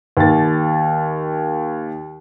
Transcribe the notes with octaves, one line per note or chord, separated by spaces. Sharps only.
D#2 A6